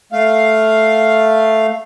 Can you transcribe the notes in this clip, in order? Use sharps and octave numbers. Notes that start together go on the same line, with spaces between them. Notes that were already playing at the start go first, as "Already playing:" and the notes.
A3 F5